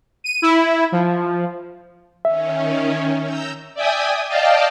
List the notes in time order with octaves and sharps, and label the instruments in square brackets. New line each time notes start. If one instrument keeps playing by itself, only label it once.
[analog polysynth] D#7
E4
F3
[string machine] D#3 C#4 [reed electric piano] E5
[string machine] A#5 E6 G6
D5 E5 G5 G#5 D#6
D5 D#5 F5 G5 A5